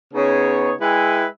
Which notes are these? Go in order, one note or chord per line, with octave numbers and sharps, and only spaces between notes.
C#3 B3 D#4 G#4 C#5
G#3 E4 B4 E5 G5 G#5